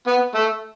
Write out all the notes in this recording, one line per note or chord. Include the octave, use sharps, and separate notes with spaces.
B3
A3